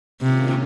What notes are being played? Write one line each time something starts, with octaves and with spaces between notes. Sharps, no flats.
G#2 C3 D#3 A#3 C#4 F4